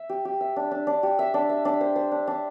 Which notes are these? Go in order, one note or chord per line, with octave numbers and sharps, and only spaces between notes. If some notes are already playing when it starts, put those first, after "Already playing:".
Already playing: E5
G4
G4
E5
D4
D4
D4
G4
E5
D4
E5
D4
C5
C5
D4
D4